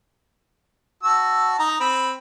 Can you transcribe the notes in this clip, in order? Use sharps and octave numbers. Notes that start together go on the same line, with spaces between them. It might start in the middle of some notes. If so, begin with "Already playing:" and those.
F#4 A5 E6
D#4 A#5
C4 B5